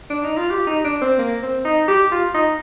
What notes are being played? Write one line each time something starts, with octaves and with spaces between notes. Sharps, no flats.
D4
D#4
F4
G4
D#4
D4
C4
A#3
C4
D#4
G4
F4
D#4